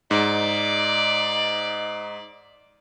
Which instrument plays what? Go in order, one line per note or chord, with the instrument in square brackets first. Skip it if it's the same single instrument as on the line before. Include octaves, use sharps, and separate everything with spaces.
[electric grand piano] G#2 [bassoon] D#4 [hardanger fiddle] D5